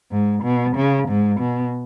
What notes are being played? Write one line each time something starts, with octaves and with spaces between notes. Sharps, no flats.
G#2
B2
C#3
G#2
B2